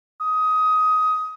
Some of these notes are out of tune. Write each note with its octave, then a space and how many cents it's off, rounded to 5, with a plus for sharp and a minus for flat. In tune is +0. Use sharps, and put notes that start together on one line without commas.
D#6 +15